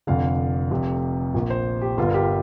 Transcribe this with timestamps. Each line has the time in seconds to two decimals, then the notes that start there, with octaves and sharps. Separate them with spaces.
0.07 F1 F2 D3 F5
0.71 F1 F2 C3
1.34 A#1 A#2
1.50 C5
1.82 G4
1.98 G1 G2 D3 F4
2.08 A#4
2.14 G4